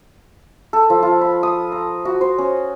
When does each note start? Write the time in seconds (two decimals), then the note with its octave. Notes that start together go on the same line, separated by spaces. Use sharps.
0.73 A4
0.90 F3
1.03 F4
1.21 B5
1.43 D#6
1.72 A#5
2.05 F#4
2.21 C5
2.38 C#4